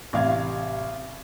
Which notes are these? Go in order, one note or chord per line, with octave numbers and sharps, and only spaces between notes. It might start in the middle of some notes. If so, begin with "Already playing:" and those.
A1 C3 F5 G#6